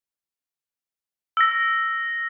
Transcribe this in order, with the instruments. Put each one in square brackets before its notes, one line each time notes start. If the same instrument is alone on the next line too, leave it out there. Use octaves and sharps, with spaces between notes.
[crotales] E6 A#6